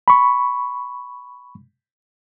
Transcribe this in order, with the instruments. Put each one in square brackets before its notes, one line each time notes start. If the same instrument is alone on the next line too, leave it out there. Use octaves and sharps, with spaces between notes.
[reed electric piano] B5 C#6